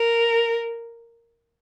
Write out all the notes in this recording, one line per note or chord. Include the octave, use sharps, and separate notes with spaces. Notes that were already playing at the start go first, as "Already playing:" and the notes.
Already playing: A#4